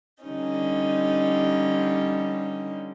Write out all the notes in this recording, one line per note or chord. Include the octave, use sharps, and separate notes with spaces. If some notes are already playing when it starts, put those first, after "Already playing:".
D3 G3 C#4 D#4